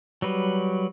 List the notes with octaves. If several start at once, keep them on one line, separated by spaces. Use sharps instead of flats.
F#3 G3 B4